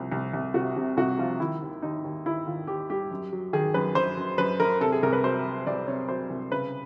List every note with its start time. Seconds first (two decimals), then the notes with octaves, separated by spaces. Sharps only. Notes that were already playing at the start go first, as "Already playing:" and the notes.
Already playing: C2 F3
0.12 C2
0.33 C2
0.54 C3 F#4
0.77 C3
0.97 C2 F#4
1.19 F3 F4
1.39 D#3 E4
1.62 D#2
1.82 D#2 D#4
2.04 D#2
2.26 D#2 E4
2.46 D#3 F4
2.67 D#2 G4
2.90 G3 G4
3.11 F#2
3.32 F#3
3.53 D#3 G#4
3.74 F#2 B4
3.95 F#2 C5
4.17 F#2
4.38 F#2 B4
4.60 F#2 A#4
4.81 C3 A4
4.92 G#4
5.02 C2 A#4
5.13 B4
5.24 F#3 C5
5.46 F#3
5.67 C2 D5
5.88 C3 C#5
6.09 F#3 C5
6.30 C2
6.52 C#3 B4